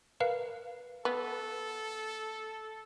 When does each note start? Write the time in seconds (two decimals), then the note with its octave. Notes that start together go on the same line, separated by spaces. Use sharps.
0.20 A#4 B4 F5
1.05 B3 A4